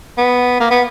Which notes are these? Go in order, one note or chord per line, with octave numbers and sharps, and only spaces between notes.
B3
A#3
B3